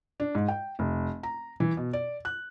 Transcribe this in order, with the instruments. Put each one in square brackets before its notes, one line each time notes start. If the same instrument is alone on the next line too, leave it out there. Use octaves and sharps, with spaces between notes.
[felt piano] D4
G#2
G5
F1
A#5
E3
B2
D5
F#6